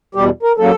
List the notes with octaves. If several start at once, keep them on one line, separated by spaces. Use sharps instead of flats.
E2 B2 G3 G4
A#4
C#3 F#3 A#3 A4